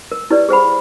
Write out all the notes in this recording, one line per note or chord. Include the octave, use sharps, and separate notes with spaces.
A#4
E4 G4 B4 C#5 D5
G#4 C5 F#5 B5